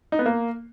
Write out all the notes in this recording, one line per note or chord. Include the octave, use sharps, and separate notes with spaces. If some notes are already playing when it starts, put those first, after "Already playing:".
D#4
B3
A#3